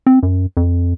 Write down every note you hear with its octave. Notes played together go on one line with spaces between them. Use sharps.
C4
F#2
F2